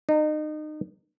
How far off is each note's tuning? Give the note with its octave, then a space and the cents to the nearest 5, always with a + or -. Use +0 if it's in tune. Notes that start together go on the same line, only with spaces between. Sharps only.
D#4 -30